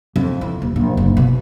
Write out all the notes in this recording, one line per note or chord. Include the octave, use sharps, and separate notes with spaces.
F2
E3
D#1
A#1
F#1
B2